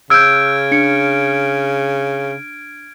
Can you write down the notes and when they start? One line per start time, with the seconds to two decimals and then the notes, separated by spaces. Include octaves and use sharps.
0.10 C#3 E6 F6 G6 G#6 D7
0.71 D4 C#7